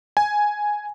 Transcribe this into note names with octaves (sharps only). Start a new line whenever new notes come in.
G#5